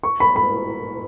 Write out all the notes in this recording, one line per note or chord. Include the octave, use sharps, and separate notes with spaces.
C#6
B5
B5